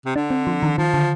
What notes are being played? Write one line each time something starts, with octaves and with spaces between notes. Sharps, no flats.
C3
D3 D4
C4
F3
D#3
D#3 F3
D3